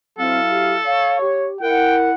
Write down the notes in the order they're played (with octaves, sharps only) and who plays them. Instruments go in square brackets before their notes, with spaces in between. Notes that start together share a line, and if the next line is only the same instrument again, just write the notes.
[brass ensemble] F#3 E4 F5 [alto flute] C4 [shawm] A4
[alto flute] G4
[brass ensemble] C#5 [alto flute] F5
[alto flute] G4
[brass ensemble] E4 F#5 [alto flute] A#4 [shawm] G5